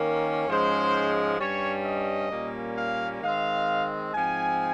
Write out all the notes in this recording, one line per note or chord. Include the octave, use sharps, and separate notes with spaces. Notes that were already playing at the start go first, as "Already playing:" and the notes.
Already playing: D#3 A#3 C#4
G#2 F3 G#3 C#4 C5
G2 G3 C#4 C#5
D#5
A#2 G3 A#3 C#4
F5
D#3 G#3 C4 F5
G#2 F3 C4 G#5